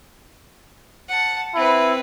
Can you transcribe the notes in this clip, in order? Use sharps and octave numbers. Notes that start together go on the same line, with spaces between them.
F#5 A5
C4 E4 B4